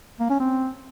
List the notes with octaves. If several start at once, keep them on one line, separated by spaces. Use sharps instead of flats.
A#3
C#4
C4